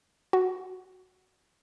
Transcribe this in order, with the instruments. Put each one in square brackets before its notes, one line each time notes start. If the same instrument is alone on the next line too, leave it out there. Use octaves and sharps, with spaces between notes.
[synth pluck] F#4